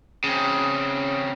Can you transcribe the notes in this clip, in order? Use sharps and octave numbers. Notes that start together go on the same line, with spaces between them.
C#3 C4